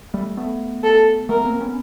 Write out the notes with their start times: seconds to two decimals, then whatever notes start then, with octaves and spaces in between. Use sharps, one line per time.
0.14 G3 A3
0.37 A3 B3
0.84 A4
1.29 A3 B3 A#4
1.45 A#3 C4
1.61 B3 C#4